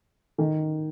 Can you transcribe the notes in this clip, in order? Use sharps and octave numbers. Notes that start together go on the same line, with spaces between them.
D#3